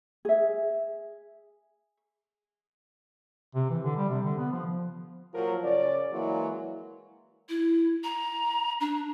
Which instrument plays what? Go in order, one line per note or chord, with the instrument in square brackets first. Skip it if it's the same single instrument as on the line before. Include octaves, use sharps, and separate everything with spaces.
[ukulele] G#4 E5
[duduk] C3
E3
D3
G3
C3
D3
B3
F3
[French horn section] A#2 F3 F#3 F4 A#4
C#3 C#4 D5
E3 F#3 G#3 A#3 E4
[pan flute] E4
A#5
D4